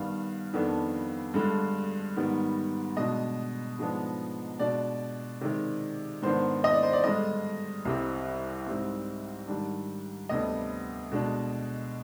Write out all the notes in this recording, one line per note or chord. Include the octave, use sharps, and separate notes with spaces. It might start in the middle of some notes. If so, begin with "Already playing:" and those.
Already playing: G2 D#3 B3 D4 F5
F2 D#3 B3 D4
G2 D3 G#3
G#2 D#3 G3 B3
B2 G#3 D4 D#5
G#2 F3 G#3 B3 D4
B2 G#3 D4 D5
C3 D#3 G#3
G#2 D#3 B3 D4 C5
D#5
D5
C5
D5
G2 D3 G#3 D#5
C2 C3 G3 C4
G#2 G3 C4
G#2 D#3 G3 D4
D2 C3 G3 B3 D4 D#5
B2 G#3 D4